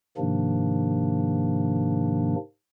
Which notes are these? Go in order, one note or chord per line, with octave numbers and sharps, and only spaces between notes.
G#2 C3 D#3 F3 A#3 D4